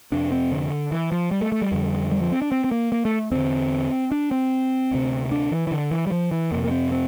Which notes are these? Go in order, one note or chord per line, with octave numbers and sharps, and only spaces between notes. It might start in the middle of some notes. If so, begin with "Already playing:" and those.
F2 C3 D4
C4
D3
E3
F3
G3
A3
A3
G3
F2 D3
G3
F3
C4
D4
C4
C4
A#3
A#3
A3
E2 D3 C4
D4
C4
D2 C3
D4
E3
E3
D3
E3
G3
F3
E3
F2 C3 A#3
A#3
C4
C4